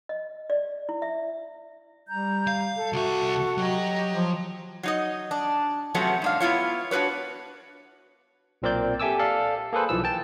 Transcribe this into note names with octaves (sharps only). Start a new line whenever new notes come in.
D#5
D5
E4
E5
G3 A#5 G6
F5
A4
C2 F#4 E5
F#3 G4 D#5 A#5
F3
F#3 D#4 D#5
D4
C3 F3 F#3 A3 B3 C#4
G#2 D4 F5
B3 E4 F4 C#5
D4 F#4 G#4 B4 C#5
B1 A#2 C4 A#4 D5 G6
G4 A4 E5 G#5 D6 E6
A4 D5 F5
A#3 G#4 A4 B4 C5
B1 E3 F3 E6
G5 A5